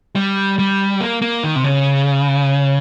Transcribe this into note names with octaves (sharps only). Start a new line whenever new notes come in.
G3
G3
A#3
A#3
D#3
C3
C#3